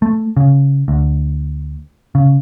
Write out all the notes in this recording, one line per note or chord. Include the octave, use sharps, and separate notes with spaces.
A3
C#3
D2
C#3